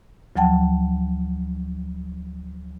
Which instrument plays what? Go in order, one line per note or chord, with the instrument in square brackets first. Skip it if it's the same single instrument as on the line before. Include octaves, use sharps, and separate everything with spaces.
[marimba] D2 F3 F#3 F#5 G5 A5